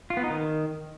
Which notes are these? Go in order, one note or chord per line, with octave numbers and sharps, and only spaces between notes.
F4
B3
D#4
D#3